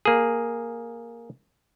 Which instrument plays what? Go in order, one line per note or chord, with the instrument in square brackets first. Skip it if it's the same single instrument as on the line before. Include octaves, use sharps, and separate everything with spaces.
[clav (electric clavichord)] A#3 G#4